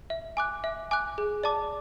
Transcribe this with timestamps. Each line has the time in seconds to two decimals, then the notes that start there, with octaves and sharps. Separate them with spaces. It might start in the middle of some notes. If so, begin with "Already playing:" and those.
0.10 E5
0.37 G#5 D6 F#6
0.64 E5
0.91 G#5 D6 F#6
1.18 G#4
1.44 D5 A5 D6